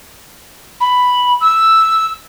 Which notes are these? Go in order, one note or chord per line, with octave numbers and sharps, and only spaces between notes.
B5
E6